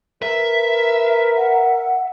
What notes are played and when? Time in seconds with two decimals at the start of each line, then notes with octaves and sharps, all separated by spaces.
0.22 A#4 B4 E5
1.37 F#5